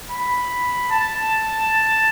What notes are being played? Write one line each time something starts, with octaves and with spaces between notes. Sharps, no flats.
B5
A5